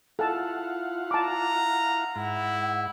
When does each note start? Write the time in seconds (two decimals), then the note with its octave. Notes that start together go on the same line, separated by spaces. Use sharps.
0.19 E4 F4 A4 F5 F#5 A5
1.11 A5 A#5 D6
2.16 G#2 E4 F#5